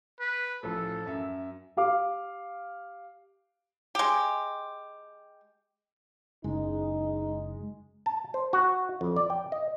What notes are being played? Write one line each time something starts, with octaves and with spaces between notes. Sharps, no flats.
B4
A1 F3 A4
F#2 E5
G4 F5 D6
G#3 G4
F#1 G#3 D#4
A5
C5
F#4
F2
D5
G5
D#5